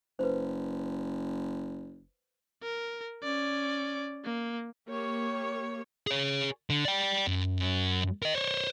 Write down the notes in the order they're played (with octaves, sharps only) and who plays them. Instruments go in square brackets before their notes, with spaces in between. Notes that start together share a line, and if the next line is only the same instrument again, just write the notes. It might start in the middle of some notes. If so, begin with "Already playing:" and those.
[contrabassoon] F#1 [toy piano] B4 C5
[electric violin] A#4
C#4 D5
A#3
[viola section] A#3 G4 C#5
[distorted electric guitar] G#4 C#5
D3
D5 G5
F#2 F#3
A#4 D#5
C5 C#5